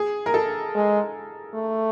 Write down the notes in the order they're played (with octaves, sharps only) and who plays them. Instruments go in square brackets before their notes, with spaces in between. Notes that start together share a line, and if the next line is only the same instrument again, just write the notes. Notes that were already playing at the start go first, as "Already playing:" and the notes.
Already playing: [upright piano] G#4
A#4
A4
[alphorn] G#3
A3